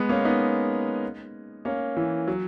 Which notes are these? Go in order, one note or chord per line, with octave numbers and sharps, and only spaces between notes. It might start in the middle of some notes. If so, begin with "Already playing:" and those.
Already playing: G#3 B3
A#3 C#4
B3 D#4
A#3 C#4
E3
F#3